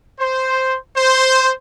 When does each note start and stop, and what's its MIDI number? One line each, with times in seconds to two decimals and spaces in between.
0.20 0.77 72
0.97 1.52 72